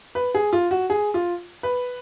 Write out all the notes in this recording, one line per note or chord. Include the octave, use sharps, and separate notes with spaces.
B4
G#4
F4
F#4
G#4
F4
B4